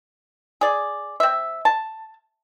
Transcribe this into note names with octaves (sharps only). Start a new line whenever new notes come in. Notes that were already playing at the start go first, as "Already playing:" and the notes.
G#4 D5
C4 E5
A5